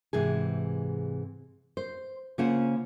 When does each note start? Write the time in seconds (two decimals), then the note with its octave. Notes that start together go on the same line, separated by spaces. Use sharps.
0.13 G#2 C3 E3 G#4
1.77 C5
2.38 C#3 A#3 C#4 F4 C5 F#5